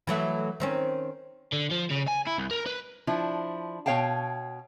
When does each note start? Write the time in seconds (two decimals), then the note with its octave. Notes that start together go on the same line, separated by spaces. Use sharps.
0.07 E3 F#3 A3
0.60 D#3 C4 C#4
1.53 D3
1.71 F3
1.91 C#3
2.08 G#5
2.27 E4
2.39 C2
2.51 A#4
2.66 B4
3.07 F3 D4 E4
3.86 B2 F4 C#5 F5 G5 A5